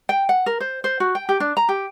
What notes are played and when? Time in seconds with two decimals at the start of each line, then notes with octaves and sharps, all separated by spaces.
0.09 G5
0.29 F#5
0.46 A#4
0.60 C5
0.84 C5
1.00 F#4
1.15 G5
1.29 G4
1.40 D4
1.57 A#5
1.69 G4